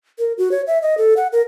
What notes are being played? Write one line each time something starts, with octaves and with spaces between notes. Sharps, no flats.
A#4
F#4
C#5
E5
D#5
A4
F#5
A#4